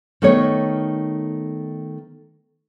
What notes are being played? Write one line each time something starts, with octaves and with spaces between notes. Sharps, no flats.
D#3 A3 B3 D#4 C#5